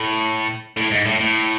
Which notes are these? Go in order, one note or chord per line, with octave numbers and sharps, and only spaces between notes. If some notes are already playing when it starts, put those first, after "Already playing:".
Already playing: A2
A2
G#2
A2
A2